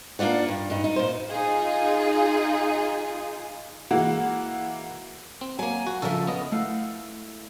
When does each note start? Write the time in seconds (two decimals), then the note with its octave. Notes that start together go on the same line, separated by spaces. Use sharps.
0.19 A#3 D4 F4 D5 F#5
0.48 G2
0.70 G2 D#4
0.84 D#4
0.96 A#2 C5
1.31 D#4 F4 G#4
3.91 E3 G#3 A#3 E4 F#4
5.41 C4
5.59 F#3 A#3 G#5
5.87 F#4
6.02 C#3 F3 A4 A#4 E5
6.27 B3 D#5
6.51 A3 E4 F5 F#5